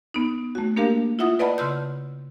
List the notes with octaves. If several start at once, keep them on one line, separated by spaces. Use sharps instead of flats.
B3 D#4
A3 F#4
A#3 D4 G4 A#4 F5
E4 F4 E5 F#5 D#6
B4 D5 D#5 F#5 A5 B5
C#3 C6 E6 G6